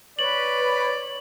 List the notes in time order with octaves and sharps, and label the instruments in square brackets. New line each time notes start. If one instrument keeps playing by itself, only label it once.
[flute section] B4 [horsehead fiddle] C#5 [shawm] D5 [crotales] F#7